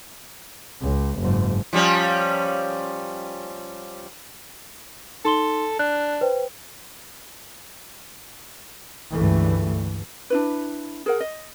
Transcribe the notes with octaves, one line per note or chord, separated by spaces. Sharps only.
C#2
F#1 G#2
F3 G3 C#4
D#4 A4 C6 G7
D4 F#6
B4 C5 G5
C#2 G2 D3 E3 A3
D4 E4 B4
G#4 A#4 F#5
D#5